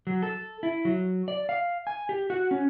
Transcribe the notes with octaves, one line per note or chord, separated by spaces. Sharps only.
F#3
A4
E4
F#3
D5
F5
G#5
G4
F#4
C#4